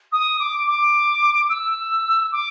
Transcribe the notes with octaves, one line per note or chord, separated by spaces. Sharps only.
D#6
D6
D6
E6
D6